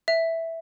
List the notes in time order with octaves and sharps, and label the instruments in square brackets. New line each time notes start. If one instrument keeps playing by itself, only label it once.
[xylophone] E5